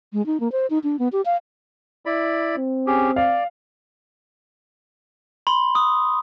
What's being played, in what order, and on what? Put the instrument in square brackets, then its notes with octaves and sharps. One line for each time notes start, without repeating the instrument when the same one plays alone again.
[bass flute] G#3
D#4
A#3
C5
D#4
D4
B3
G4
F5
[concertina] E4 D5 B5
[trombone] C4
[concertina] C#4 G4 G#4
[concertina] D5 [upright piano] F5
[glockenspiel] B5 C6
D#6